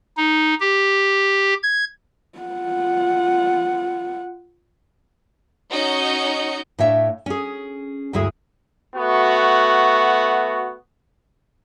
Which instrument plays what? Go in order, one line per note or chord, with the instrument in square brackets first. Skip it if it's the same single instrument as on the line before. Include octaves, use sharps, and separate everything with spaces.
[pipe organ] D#4
G4
G#6
[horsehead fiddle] F4 F#5
[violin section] C#4 D#4 F#4 D#5 G6 C#7
[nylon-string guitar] A2 D4 C#5 E5 F5
C#4 G#4
D2 G2 G#3 E4 G#4
[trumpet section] A3 B3 F#4